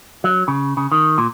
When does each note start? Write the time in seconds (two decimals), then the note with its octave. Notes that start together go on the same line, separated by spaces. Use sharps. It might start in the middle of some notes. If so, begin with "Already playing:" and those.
0.24 F#3
0.48 C#3
0.77 C#3
0.92 D#3
1.18 A#2